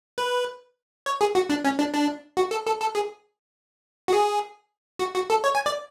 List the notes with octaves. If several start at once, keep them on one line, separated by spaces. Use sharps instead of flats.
B4
C#5
G#4
F#4
D4
C#4
D4
D4
F#4
A4
A4
A4
G#4
F#4
G#4
F#4
F#4
A4
C#5
G#5
D5